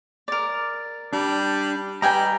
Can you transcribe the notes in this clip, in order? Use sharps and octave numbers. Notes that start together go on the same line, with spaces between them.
A#4 D5
G3 D4
G3 B4 D#5 G5 G#5 A#5